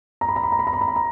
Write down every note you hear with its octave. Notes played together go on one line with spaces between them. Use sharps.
A#5
B5
A#5
B5
A#5
B5
A#5
B5
A#5
B5
A#5